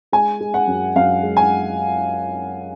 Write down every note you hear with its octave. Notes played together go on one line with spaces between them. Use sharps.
G#3 G#5
G#3
F#5
F#2
F#2 F5
G#3
G#5